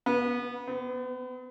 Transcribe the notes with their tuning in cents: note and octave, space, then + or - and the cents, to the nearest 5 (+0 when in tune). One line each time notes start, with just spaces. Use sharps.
B3 -25
B3 +40